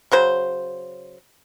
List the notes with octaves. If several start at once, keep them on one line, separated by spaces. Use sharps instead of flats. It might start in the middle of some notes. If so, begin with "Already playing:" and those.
C#3 F#3 C5